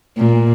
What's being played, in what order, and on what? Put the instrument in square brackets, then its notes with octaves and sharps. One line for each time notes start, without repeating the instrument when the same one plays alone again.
[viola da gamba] A#2